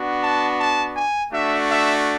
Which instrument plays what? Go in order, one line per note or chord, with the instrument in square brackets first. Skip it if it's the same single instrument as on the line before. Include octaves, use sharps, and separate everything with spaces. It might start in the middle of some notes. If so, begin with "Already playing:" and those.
Already playing: [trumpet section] B3 D4 F#4
A5
A5
G#5
A3 D4 F#4 E5
E5